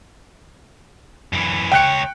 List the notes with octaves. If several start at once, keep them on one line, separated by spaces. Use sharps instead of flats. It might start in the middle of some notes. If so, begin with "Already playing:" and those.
F#2 E3
C#2 C#5 G5 F#6 C#7